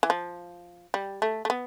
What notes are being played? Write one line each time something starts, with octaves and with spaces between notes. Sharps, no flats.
E3
F3
G3
A3
A3
B3